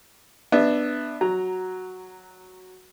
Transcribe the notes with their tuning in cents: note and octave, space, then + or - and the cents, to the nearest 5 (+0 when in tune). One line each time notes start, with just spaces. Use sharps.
B3 +0 D4 +15 E5 +0
F#3 +0 A#5 +0